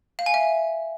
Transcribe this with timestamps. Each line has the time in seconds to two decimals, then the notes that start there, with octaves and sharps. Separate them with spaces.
0.19 F5
0.26 G#5
0.34 E5